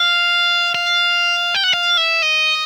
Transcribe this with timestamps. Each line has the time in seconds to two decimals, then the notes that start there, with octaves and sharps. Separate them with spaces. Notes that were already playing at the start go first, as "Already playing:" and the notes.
Already playing: F5
0.75 F5
1.55 G5
1.64 F#5
1.74 F5
1.97 E5
2.22 D#5